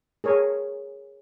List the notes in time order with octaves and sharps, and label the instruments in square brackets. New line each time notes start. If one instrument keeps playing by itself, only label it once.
[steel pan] G#4 A#4 C#5